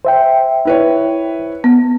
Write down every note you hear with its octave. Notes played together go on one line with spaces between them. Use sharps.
C5 E5 G5
E4 B4 C#5
B3